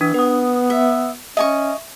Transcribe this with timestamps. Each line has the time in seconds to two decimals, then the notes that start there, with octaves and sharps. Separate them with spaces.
0.01 E3 D4
0.14 B3 B4 D#6
0.70 E5
1.37 C#4 D#5 E5 G#5 C#6